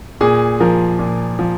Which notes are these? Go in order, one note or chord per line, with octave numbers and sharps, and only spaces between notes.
A#2 G#4
F3 A#4
A#2
F3